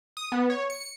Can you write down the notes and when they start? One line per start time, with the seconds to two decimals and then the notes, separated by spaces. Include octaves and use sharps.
0.17 D#6
0.32 B3
0.50 C#5
0.70 C#7